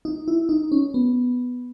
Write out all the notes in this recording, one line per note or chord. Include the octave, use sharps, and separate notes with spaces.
D#4
E4
D#4
C#4
B3